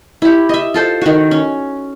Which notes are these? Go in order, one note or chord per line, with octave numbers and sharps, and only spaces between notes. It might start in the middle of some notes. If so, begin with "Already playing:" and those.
E4 G4
D#5 E5
F4 A4 C5
D#3 F#4
C#4